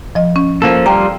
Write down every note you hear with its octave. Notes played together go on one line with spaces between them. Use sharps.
F3 D#5
C#4
F3 A#3 A4
G3 F4 G5 A#5